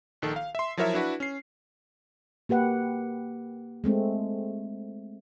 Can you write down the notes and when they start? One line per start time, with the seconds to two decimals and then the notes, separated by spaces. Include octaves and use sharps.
0.22 A#1 D#3 A4
0.36 F5
0.55 E5 C6
0.77 F3 F#3 E4 A#4 C#5 E5
0.94 D4 E4 F#4 B4
1.20 C#4 C7
2.49 A#3 G4 B4 F#5
3.84 G#3 A3 C4